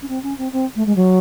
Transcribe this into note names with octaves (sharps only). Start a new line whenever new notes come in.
C#4
C4
C#4
C4
C4
A3
G#3
F#3